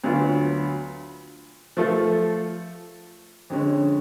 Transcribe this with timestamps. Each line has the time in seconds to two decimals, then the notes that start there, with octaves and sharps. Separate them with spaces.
0.04 D2 D3 F#3 B3 F4
1.77 F3 A3 F4 A4
3.50 F2 D3 G#3 C#4